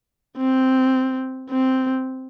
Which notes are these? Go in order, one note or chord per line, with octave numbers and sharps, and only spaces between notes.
C4
C4